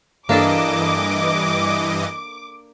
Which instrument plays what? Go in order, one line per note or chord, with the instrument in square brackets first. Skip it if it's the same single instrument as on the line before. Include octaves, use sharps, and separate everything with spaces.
[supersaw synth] G2 E3 D#5 [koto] A#3 D4 A4 [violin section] D6